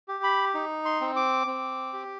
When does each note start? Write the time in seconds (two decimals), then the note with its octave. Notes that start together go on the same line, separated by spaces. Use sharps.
0.08 G4
0.23 B5
0.54 D#4
0.85 C6
1.01 C4
1.16 D6
1.47 C4
1.93 G4